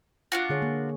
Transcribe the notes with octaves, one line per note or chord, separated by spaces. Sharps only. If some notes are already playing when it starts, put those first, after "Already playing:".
D4 F4 F#4
D3 G#4 C#5
A#3